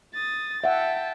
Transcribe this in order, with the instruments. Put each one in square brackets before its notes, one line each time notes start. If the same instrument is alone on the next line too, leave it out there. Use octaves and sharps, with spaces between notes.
[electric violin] D#6 A6
[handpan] E5 F#5 [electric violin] G5 A5